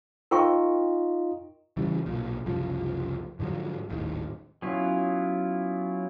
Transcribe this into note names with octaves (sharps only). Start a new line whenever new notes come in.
D#4 F4 A#4 D#5 G5 C#6
C#3 E3 G3
B1 A#2
F#1 C2 F3
G#2 D3 F3 F#3
D#1 G#1 A2 D#3
F#3 B3 C#4 E4 F4